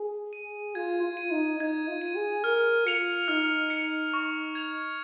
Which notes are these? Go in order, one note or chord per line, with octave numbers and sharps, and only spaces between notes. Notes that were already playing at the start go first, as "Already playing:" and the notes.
Already playing: G#4
D#7
F4 G#6
F4
D#7
D#4
D#4 G#6
F4
D#7
G#4
A#4 F6
F4 C#7 F7
D#4 F6
C#7 F7
C#6
G#6 F7